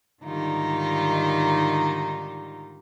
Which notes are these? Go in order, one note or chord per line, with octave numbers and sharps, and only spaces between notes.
G#2 D3 D#3 G3 D#4 F4